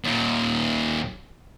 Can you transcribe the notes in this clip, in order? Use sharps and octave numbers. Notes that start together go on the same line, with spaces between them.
D#2 A#2